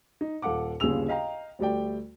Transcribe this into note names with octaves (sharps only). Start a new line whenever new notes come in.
D#4
D#1 A4 F5 F#5 D6
G1 D#2 C#3 G#4 E6 F7
D#5 F5 G5 A#5
D2 G3 A3 D5 G5